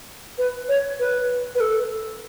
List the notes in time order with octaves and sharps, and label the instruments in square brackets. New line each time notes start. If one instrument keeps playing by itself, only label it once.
[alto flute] B4
C#5
B4
B4
A4